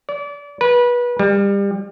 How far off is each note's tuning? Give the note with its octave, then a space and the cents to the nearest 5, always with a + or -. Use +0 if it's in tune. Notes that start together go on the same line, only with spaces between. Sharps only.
D5 -30
B4 -25
G3 +30